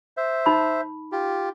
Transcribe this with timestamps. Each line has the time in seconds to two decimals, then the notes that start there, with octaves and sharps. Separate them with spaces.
0.17 C5 E5
0.46 D#4 B5
1.12 F4 G4